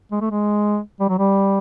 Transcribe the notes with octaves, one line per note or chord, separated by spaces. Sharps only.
G#3
A3
G#3
G3
F#3
G3